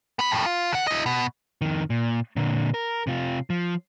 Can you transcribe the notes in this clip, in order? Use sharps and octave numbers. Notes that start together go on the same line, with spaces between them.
B3 B5
F2 A2
F4
D3 F#5
E4 D#5
B2
F2 D#3
A#2
A#2 D3
A#4
C3 F4
F3